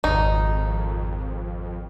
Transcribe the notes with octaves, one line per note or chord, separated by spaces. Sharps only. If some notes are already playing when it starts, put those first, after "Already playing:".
G#1 F2 D#4